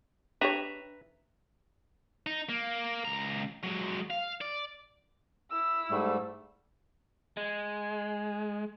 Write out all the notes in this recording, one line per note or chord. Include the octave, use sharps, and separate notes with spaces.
D4 G4 B4 C#5 E5 A#5
D#4
A#3
C#2 A#5
F#3 G#3
F5
D5
E4 E6
G#2 G3 A3
G#3